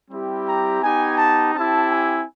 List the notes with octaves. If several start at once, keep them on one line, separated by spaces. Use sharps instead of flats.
G3 C4 E4 G4
A#5
B3 D#4 G4 G#5
A5
C4 E4 G4 A5
G#5